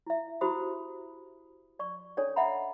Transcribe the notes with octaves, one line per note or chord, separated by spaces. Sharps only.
E4 E5
E4 F#4 G4 C5 B5 D#6
D5 C#6
C#4 D4 A4 C#5 D5
D#5 E5 F#5 A#5 B5